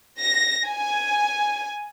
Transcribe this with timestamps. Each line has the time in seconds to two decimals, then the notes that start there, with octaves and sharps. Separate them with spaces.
0.19 A#6
0.67 G#5